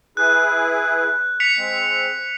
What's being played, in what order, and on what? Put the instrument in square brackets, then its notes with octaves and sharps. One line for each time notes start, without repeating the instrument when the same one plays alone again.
[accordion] E4 G#4 B4 [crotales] F#6
[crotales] B6 C#7 F7
[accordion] G#3 C4